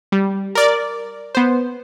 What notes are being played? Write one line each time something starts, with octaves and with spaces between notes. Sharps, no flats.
G3
A#4 D5
B3 C5